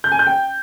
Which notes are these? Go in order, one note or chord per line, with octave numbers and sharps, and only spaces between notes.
G6
G#5
G6
G5